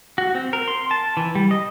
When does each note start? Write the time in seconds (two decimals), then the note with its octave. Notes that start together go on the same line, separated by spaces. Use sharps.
0.18 F#4
0.35 C4
0.53 A#4
0.68 C6
0.91 A5
1.17 E3
1.35 G3
1.51 D#5